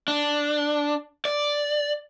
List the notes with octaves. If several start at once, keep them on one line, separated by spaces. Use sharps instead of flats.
D4
D5